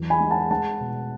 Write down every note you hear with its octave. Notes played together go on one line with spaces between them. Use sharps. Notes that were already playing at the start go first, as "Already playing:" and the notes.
Already playing: E2 F#3
G#5 B5
G#3
F#5 A5
G#3 F#5 A5
B2